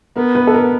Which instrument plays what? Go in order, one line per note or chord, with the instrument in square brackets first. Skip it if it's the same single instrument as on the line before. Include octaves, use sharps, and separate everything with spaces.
[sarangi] B3 [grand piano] A#4
[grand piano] B4
A4
A#4